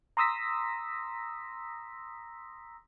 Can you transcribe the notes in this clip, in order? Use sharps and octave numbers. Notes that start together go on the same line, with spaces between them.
A#5 C6 D#6 E6 A#6 B6